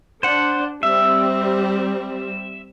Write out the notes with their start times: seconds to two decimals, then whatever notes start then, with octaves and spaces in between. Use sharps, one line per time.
0.23 D4 C5 F#5
0.83 G3 C4 E5